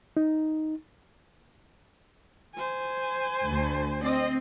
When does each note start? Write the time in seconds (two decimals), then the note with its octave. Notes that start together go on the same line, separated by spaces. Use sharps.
0.17 D#4
2.55 C5 G#5
3.46 D2
4.04 C4 D#5